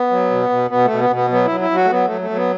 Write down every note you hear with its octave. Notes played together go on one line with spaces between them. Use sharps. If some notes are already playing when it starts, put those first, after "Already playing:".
Already playing: B3
F#3
B2
B2
B2 B3
A3
B2
B3
B2
B3
F#3 B3
F#3 E4
E4
F#3
F#4
A3
F#3 B3
F#3 A3
A3
F#3
B3